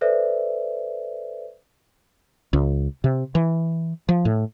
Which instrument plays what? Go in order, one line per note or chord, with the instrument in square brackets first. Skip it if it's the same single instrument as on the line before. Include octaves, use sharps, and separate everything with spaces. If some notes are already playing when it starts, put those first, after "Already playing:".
[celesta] A4 B4 C5 D5 E5
[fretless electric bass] C#2
C3
E3
F3
A2